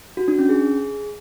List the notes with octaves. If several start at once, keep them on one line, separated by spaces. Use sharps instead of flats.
F#4
D4
C#4
G#4